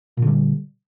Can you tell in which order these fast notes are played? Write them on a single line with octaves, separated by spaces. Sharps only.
A#2 D3 G3